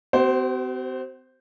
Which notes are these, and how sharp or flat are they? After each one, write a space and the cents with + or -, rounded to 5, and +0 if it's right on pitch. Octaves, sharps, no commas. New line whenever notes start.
C4 -40 F#4 +45 C5 +0